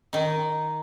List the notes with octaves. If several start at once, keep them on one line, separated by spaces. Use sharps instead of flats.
D#3 D#4